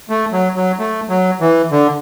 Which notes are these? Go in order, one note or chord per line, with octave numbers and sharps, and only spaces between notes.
A3
F#3
F#3
A3
F#3
E3
D3